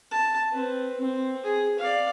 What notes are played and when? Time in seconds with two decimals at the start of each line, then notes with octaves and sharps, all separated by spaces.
0.12 A5
0.52 C4 B4
1.00 C4
1.43 G#4
1.79 D5 F5